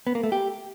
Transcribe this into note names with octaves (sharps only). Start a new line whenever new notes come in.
B3
A#3
A3
G4